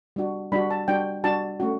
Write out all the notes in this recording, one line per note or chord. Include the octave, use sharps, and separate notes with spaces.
G3 D4 F#4
G3 D4 F#4 B5
A5
G3 D4 F#4 G5
G3 D4 F#4 A5
A3 C#4 F#4